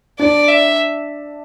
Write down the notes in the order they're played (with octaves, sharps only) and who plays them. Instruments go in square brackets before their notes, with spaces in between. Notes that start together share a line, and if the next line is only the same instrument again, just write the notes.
[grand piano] D4 [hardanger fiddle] D5
[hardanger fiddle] E5